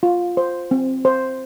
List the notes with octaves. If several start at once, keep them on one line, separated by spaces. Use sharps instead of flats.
F4
C5
C4
C5